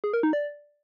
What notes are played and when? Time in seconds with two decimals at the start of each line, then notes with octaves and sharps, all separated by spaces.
0.04 G#4
0.13 A#4
0.23 D#4
0.33 D5